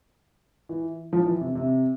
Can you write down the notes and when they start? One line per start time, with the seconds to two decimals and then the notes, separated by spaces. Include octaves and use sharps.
0.69 E3
1.13 F3
1.27 E3
1.41 C3
1.55 C3